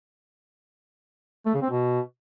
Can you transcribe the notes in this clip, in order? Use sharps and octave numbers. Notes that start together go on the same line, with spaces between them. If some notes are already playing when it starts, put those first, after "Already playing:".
A3
C#3
C4
B2